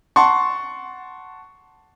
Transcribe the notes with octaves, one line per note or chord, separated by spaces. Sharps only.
F#5 A5 C6 C#6